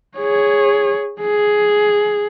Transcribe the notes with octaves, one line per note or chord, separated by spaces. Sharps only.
G#4 C#5
G#4